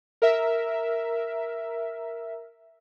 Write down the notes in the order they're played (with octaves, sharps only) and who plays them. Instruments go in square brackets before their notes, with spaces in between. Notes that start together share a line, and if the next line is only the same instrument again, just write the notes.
[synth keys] A#4 E5